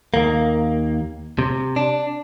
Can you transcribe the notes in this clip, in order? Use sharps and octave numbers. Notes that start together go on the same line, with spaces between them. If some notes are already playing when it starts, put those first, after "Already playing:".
D#2 A#3
C3
D4